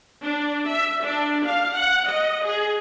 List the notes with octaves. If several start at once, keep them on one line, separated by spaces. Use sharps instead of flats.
D4
E5
D4
F5
F#5
D#5
G#4